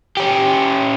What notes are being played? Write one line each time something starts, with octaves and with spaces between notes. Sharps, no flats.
C#4 G4